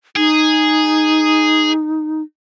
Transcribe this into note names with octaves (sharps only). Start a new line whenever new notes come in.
D#4 G#4